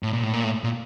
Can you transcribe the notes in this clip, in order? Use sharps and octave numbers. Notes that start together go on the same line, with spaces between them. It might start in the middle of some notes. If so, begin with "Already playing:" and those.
A2
A#2
A2
A#2
A2
A#2